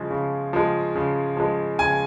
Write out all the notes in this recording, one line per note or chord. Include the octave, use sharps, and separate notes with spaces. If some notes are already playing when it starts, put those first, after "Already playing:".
Already playing: C#3 F3 G#3
C#3
F3 G#3
C#3
F3 G#3
C#3 G#5